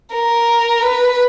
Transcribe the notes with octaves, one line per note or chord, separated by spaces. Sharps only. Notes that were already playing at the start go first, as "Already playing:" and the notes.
A#4
B4